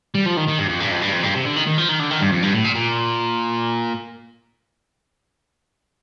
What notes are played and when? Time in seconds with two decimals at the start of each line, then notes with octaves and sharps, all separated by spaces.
0.15 G3
0.26 F3
0.37 D#3
0.48 D#3
0.58 G2
0.69 F2
0.80 G2
0.91 F2
1.02 G2
1.13 F2
1.24 G2
1.35 C3
1.45 D3
1.56 D#3
1.67 D#3
1.78 F3
1.89 D#3
2.00 D3
2.11 D#3
2.21 G2
2.32 F2
2.43 G2
2.54 A2
2.64 A#2
2.75 A#2